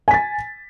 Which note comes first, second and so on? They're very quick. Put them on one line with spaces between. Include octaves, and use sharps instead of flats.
G#5 B6 A6